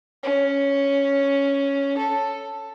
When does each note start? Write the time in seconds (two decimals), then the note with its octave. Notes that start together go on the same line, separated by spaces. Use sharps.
0.23 C#4
1.98 A4